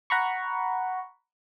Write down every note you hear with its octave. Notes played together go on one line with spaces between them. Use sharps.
F#5 A#5 B5 C#6